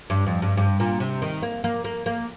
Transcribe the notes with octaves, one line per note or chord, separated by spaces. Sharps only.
G2
F2
G2
G2
A#2
C3
D#3
A#3
A#3
A#3
A#3